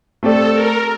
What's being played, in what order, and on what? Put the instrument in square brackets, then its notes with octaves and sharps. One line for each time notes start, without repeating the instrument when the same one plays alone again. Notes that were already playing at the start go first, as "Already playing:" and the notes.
[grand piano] A3 C4 G4 D5 [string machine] A4
[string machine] A#4